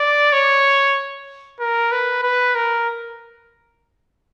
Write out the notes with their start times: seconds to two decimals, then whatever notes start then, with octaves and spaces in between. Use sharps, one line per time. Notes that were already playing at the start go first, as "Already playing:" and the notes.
Already playing: D5
0.33 C#5
1.60 A#4
1.92 B4
2.23 B4
2.55 A#4